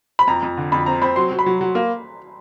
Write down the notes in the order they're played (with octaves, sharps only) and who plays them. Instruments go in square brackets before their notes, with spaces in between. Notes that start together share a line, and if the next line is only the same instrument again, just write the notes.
[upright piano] B5
[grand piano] F2 [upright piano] A#5
[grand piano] F2
D3
[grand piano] F2 [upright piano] B5
[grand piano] C4 [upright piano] A#5
[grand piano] C4 [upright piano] B5
[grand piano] F#3 [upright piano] C6
[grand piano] F#3
[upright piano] B5
[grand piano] F#3
F#3
A#3